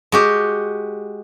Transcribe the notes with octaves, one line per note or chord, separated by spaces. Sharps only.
G#3 F#4 G4